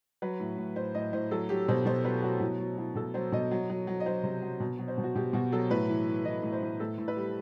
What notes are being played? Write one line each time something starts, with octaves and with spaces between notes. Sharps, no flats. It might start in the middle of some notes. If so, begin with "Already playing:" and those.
F#3 B4
A2
A2
A2 C5
A2 D#5
A2 C5
F#3 A4
F#3 G4
B2 C5
B2 C5
F#3 B4
F#3 F#4
B2 E4
F#3
F#3 E4
B2 A4
F#3 C5
B2 D#5
F#3
F#3
F#3
D#5
F#3 C5
C3
F#3
B2
F#3
C5
B2
F#4
B2 G4
B2 F#4
F#3 A4
A2 B4
E3
E3
E3 D#5
A2
C5
A2
A2 A4
A2
B4
G3